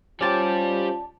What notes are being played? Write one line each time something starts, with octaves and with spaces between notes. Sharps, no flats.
G3 C#4 F4 G4 C5 D5 A5